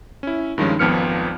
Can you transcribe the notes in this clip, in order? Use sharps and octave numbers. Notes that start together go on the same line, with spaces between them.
C#4 E4
G2 D#3 F3 G#3 C#4
G#1 F2 F3 B3 F6 C#7